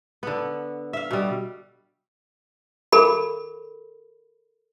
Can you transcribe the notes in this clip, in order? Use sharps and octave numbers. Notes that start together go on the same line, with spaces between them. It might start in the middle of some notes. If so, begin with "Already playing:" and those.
D3 B3
E5 F5
B2 G3
A4 A#4 B5